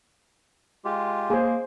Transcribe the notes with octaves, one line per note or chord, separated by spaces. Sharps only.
G#3 F4 G4
A#3 G#4 C5